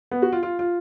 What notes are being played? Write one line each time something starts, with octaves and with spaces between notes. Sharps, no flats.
B3
F#4
F4
F4
F4